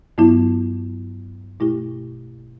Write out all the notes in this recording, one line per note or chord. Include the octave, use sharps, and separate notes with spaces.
G2 F#3 B3 E4
B2 A3 E4 G4